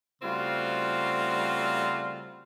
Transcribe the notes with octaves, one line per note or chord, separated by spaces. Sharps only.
C#3 G3 A3 C4 F4 F#4